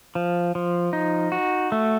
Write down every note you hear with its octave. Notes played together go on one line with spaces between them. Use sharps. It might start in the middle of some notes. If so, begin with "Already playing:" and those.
F3
F3
D#4
F#4
A3